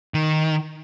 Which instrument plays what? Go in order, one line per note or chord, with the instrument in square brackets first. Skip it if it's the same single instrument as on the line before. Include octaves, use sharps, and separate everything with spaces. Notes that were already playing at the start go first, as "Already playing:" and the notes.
[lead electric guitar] D#3